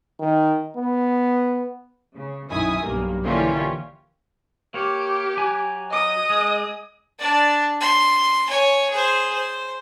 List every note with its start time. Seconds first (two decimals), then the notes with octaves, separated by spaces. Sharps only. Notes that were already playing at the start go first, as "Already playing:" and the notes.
0.20 D#3
0.77 B3
2.15 C#3
2.49 B1 F#2 D#3 E4 G#5 D#6
2.82 B1 G2 A#3
3.23 D3 E3 A#3 C#4 F4 G4
4.74 A#3 G4 C#5
5.37 F#3 G#5
5.91 D#5 D#6
6.30 G#3
7.20 D4 D5
7.81 C6
8.49 C#5 G#5
8.90 G#4 C5
9.34 C5